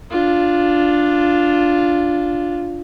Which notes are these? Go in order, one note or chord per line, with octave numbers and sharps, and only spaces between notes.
D4 F4